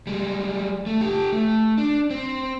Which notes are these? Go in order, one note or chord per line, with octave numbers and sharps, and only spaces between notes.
G3 G#3
A3
G4 A4
A3
D4
C4